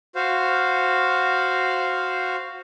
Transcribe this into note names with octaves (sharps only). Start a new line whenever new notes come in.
F#4 C5 F5